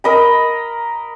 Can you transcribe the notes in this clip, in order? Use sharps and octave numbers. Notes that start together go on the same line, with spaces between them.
A#4 D#5 B5